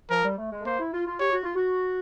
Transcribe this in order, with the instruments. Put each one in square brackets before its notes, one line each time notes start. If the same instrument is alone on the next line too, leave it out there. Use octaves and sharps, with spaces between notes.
[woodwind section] F3 [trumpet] A#4
[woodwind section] G3
A3
G#3
A3
[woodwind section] A#3 [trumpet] C5
[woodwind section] E4
F4
F4
[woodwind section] G4 [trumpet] C#5
[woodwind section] F#4
F4
F#4